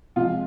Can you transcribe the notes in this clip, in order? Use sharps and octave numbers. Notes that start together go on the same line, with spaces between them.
C3 F3 G#3 F4